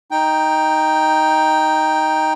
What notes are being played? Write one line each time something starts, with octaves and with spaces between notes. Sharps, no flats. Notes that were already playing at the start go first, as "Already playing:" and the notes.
D#4 G5